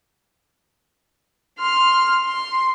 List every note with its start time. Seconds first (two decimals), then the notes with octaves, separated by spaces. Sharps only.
1.58 C6 F6
2.24 C6